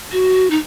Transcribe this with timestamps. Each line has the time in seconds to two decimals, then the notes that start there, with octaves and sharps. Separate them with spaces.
0.12 F#4
0.50 D#4